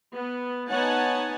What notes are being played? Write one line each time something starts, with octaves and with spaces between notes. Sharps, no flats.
B3
B3 D#4 C#5 F#5 G#5 A5